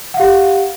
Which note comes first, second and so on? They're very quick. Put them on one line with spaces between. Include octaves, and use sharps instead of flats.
F#5 F5 G4